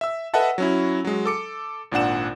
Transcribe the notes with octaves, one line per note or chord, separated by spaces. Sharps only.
E5 E6
A4 B4 D#5 E5 F#5 A5
F#3 C#4 E4
F#3 G#3
A4 D6 C#7
G#1 A#2 D4 F#5 E7